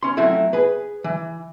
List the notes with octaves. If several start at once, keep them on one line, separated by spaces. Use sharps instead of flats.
C#4 C6
F3 F#3 A3 C4 E4
G#4 B4
E3